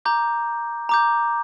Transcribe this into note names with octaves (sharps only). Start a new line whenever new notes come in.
A#5 D6 G6
A#5 D6 G6